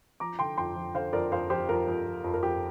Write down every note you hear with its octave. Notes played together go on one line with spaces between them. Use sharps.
F3 A#5 D6
D3 G5 C6
F2 G5 C6
F3
D3 C5 F5
F2 A#4 D5
F2 C5 F5
F3 G4 C5
F2 F4 A#4
F2
F2
F2
A#4
F2 G4